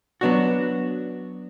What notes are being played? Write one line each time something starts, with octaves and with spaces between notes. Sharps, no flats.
F#3 B3 D4 F#4